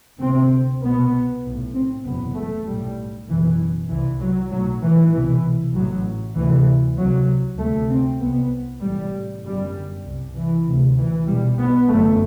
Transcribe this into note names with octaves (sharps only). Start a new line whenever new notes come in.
D2 C3 C4
C2 B2 B3
B1 A2
C4
F#1 E2 B2 B3
A3
B1 A2 G3
F#1 E2 B2 E3
C2 C3 E3
F#3
B1 A2 F#3
E3
C2 B2 E3
A1 A2 F#3
D2 C3 E3
C2 C3 F#3
D2 C3 A3
C4
C2 C3 B3
A1 A2 G3
G1 F#2 G3
C2 C3
E3
D2 C3
E3
B1 B2 G3
B3
G1 F#2 A3